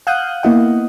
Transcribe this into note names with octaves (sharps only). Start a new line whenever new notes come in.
F5 F#5 D#6 F#6 G6
A#3 B3 E4 D#5 F#5